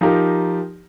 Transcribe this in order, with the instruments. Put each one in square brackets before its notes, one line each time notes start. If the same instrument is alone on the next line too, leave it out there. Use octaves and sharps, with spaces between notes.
[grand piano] F3 D#4 G4 A#4